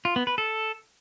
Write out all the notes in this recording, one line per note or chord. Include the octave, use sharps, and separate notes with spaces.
F4
B3
B4
A4